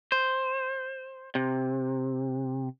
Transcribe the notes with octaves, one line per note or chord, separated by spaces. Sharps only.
C5
C3